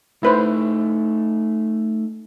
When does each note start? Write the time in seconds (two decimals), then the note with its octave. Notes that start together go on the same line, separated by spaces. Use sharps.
0.23 A3 D#4 E4 B4 C5